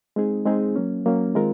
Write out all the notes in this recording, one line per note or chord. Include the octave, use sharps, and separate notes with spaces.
G#3 C4 D#4 G#4
G#3 C4 D#4 G#4
F#3 A#3 C#4
F#3 A#3 C#4
D#3 G#3 C4 F4 A#4